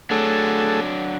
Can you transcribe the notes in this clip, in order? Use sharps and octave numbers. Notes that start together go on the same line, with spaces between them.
F#3 A3 D4 G#4 A4